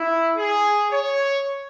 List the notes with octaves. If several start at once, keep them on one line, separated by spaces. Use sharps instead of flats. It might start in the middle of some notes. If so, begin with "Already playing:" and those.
Already playing: E4
G#4
C#5